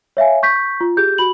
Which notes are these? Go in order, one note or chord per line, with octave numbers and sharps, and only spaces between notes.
C#5 E5 F5 G#5
C#6 G6 B6
F4
G4 G#4 G6
F#4 B5 F#7